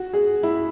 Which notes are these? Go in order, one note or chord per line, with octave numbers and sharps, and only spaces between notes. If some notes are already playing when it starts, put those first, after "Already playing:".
Already playing: F#4
G#4
E4